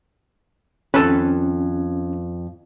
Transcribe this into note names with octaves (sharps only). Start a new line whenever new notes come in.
F2 D#3 C#4 A4 B4